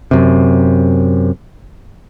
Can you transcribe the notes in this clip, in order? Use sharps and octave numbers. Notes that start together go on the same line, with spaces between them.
F#2 C3